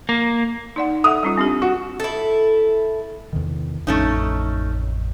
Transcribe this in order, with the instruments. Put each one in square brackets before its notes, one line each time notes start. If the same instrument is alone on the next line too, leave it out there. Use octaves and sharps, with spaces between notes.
[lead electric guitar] A#3
[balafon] D#4 D5 F#5
[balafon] A4 E5 F#5 [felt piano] D#6
[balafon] G3 C#4 F4
C4 D4 G4
[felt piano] F#4
[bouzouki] E4 A4
[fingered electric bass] E2 C3 D#3
[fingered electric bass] A1 F2 [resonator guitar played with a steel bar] A3 C#4 D#4